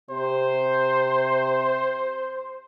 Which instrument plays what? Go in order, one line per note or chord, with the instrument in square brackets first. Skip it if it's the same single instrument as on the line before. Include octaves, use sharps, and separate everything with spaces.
[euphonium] C3 [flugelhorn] C5